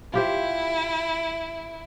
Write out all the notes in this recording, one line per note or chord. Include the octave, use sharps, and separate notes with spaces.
E4 F4 G4 C5